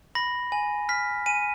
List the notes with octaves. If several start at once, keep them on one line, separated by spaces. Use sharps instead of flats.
B5 A#6
G#5
F6 B6
G#5 D#7